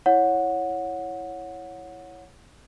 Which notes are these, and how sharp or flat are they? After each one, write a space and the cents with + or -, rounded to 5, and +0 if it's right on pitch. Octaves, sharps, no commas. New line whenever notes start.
E4 +0 C#5 +0 F#5 -20